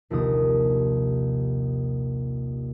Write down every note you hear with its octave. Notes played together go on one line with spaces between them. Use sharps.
A#1 D#2 C3 D#6